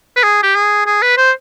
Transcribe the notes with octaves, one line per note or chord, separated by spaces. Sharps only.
B4
G#4
G4
G#4
G#4
B4
C5